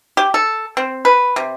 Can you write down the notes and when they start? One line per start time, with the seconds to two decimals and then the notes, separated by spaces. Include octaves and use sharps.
0.17 G4
0.34 A4
0.77 C4
1.05 B4
1.36 C3